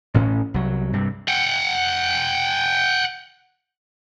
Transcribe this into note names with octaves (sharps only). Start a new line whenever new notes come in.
A1 A2 C#4
C2 F#3
G2 C3
F#5 G5